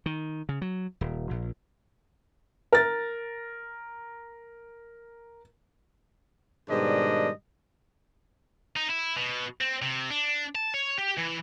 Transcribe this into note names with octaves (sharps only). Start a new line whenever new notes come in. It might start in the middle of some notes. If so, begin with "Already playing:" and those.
D#3
C#3
F#3
D#1
A#1
A#4 A6
G#2 B2 D#3 G3 D4 D#5
D#4
E4
B2
C4
C3
D4
A5
C#5
G4
E3